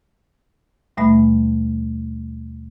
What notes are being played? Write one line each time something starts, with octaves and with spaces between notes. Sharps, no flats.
D#2 B2 G3 A3 E5 B5